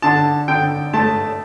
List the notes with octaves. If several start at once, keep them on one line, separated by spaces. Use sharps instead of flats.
D3 A5
D3 G5
A3 A5